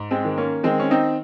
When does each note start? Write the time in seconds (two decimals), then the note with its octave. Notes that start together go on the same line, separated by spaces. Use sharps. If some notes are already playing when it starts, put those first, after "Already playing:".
Already playing: G#2
0.11 G#3 C4
0.24 D#3
0.37 A#3 C#4
0.63 D#3 G#3 C4
0.80 C#4
0.91 C4 D#4